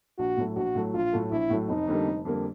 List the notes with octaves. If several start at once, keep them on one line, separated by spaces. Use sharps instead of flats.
A#1 F#4
A2 F#3 A3
A#1 F#4
A2 F#3 A3
A#1 F4
A2 F#3 A3
A#1 E4
A2 F#3 A3
F1 D#4
F2 D3 G3 A#3
F1
F2 D3 G3 A#3